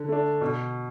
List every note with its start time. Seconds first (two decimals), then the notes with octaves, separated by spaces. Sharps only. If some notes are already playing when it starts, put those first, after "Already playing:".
Already playing: D3
0.09 A3 D4
0.41 B2